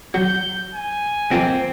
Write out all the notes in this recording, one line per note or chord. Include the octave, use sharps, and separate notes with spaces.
F#3 G6
G#5
D#3 F3 A#3 C4